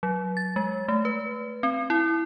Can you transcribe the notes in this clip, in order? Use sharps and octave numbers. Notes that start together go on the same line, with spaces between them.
F#3
A6
G#3
A3
B4
C4
E4